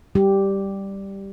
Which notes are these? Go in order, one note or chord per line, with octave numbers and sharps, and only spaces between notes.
G3 G4